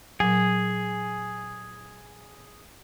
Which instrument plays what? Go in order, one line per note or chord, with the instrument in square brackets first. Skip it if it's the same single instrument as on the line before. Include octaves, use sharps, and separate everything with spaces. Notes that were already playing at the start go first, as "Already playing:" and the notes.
[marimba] A#2 F#3 [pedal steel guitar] G#4